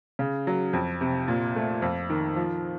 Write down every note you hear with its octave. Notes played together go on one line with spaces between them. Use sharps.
C#3
F#3
F2
C3
A#2
A3
F2
D#3
F3